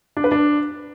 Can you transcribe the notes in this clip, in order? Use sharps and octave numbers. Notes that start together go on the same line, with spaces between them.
D4
B4
D4